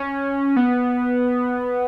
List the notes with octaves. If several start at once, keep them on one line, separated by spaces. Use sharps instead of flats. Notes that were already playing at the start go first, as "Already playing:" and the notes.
Already playing: C#4
B3